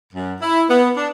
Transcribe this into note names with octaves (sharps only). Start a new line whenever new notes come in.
F#2
E4
B3
D4